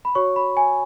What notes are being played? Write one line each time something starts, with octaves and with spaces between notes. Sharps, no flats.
B5
F#4 C#5 C#6
B5
G#5